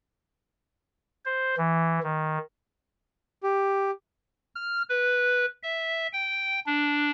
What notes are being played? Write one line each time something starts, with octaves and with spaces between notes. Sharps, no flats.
C5
E3
D#3
G4
F6
B4
E5
G5
D4